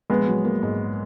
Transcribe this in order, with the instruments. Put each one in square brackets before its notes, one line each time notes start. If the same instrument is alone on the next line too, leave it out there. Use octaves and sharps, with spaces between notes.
[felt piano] A#1 [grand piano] G#3 B3
[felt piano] F#3
A#3
G#2